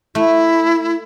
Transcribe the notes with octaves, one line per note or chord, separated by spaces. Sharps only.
A3 E4